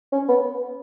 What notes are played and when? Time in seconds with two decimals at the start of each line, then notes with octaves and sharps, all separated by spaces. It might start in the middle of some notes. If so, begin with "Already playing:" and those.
0.13 C#4
0.28 B3